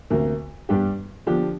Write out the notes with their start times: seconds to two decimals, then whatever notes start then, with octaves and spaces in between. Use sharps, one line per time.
0.10 D2 C3 A#3
0.69 G2 G3 D4 G4
1.26 D3 F3 D4 G4